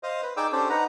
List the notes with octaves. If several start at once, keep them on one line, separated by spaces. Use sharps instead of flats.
C5 D#5 F5 D#6
B4
D#4 G#4 D5 G5 D6 E6
C#4 D4 G4 A4 C5 D5
D#4 B4 F#5 A#5